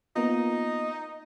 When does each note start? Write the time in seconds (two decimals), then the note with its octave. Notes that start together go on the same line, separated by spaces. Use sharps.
0.16 A#3 B3 D#4 F4